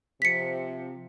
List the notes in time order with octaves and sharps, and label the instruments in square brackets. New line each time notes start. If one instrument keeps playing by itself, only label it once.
[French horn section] C3 F3 [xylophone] B6 C#7